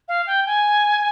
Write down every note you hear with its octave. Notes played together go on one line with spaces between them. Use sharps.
F5
G5
G#5